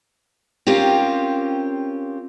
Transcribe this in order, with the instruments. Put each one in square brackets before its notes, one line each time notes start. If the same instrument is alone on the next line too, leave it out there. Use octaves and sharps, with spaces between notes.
[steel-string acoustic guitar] C4 C#4 F4 G4 A#4